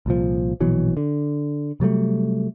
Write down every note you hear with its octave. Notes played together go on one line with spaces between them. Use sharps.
C2 A#2 F3
A#1 B2 E3 F#3
D3
C3 F#3 G3 A3